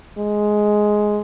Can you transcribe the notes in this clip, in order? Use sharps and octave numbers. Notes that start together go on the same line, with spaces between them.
G#3